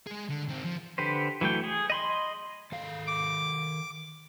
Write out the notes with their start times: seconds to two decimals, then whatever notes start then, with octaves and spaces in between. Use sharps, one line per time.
0.07 G#3 G#4
0.30 D3
0.48 D#3 C4
0.65 F3
0.98 D3 G4 B4 C5
1.41 E3 F#3 A3 G5
1.64 G#4
1.90 D#5 B5 C6
2.72 D#3 A4 F5
3.07 D6